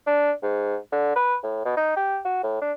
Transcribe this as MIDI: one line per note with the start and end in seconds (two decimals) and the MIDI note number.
0.07 0.32 62
0.43 0.77 44
0.92 1.14 50
1.16 1.36 71
1.44 1.62 45
1.65 1.76 47
1.77 1.96 63
1.96 2.19 67
2.25 2.40 66
2.43 2.61 45
2.61 2.72 62